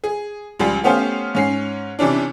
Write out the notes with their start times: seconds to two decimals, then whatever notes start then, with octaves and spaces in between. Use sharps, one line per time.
0.04 G#4
0.60 C#2 F3 G3 F4 G#5
0.84 A3 B3 C#4 G4 C5 F5
1.35 G#2 C#4 C7
1.99 C3 E3 C#4 D4